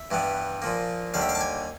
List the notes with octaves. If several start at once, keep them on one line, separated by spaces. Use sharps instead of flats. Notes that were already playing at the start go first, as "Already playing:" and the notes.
Already playing: E5
G2 E3 G3 B3
A#2 F3 A#3
D#2 D3 G3 F5
E5
F5
A5
G#5